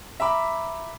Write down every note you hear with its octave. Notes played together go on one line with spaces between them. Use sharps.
E5 A#5 B5 D6